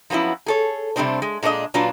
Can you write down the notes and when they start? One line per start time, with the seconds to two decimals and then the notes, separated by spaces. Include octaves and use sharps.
0.10 F3 F#3 B3 C#4 E4
0.46 G#4 A4 C#5
0.96 C3 G3 A3 C4 D4 C5
1.22 G#3
1.43 A#2 G#3 D4 B4 D#5
1.74 A#2 F#3 D4 F4 B4